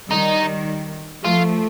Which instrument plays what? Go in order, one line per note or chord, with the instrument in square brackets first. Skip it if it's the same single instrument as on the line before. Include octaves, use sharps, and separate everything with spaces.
[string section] D#3 G3 [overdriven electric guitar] D#4
[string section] F3 A3 [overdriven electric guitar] F4